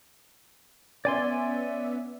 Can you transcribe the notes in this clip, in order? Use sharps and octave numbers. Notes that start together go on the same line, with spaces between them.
B3 C#4 D5 E5 G#5 C6